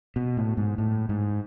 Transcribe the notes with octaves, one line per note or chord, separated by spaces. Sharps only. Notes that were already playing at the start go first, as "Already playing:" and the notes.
B2
A2
G#2
A2
G#2